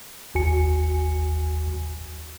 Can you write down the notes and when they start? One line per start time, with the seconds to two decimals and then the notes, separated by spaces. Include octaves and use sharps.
0.34 G1 D#2 F#4 G#5 C#7